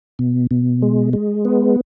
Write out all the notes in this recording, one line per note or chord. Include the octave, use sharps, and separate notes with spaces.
B2
B2
G#3
G#3
B3